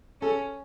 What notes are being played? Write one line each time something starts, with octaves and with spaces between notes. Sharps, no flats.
C#4 A4